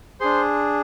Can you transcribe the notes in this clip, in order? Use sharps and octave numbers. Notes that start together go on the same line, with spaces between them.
D4 G#4 C5 C6